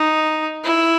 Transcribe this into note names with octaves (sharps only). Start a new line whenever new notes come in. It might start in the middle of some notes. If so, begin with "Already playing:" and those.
Already playing: D#4
E4